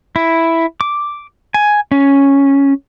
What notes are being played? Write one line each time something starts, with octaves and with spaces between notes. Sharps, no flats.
E4
D6
G#5
C#4